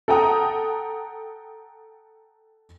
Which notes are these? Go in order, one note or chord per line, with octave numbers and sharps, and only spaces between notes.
A4 F#5 G5 A#5 D#6